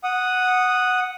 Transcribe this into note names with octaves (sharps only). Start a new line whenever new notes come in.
F#5 D#6